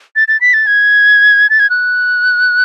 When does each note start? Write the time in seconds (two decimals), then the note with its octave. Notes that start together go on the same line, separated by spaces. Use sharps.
0.16 A6
0.28 A6
0.41 B6
0.54 A6
0.67 G#6
1.50 A6
1.60 G#6
1.70 F#6